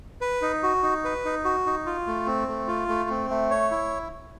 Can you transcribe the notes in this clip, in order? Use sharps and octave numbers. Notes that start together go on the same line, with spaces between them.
B4
D#4
F#4
D#4
B4
D#4
F#4
D#4
F4
A3
C4
A3
F4
A3
C4
A3
C#5
E4